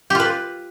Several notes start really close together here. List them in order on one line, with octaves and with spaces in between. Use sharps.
G4 F4 B4